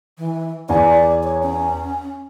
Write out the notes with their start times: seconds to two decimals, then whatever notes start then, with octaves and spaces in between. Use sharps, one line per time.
0.18 E3
0.69 E2 D5 G#5
1.24 C#5
1.43 C#4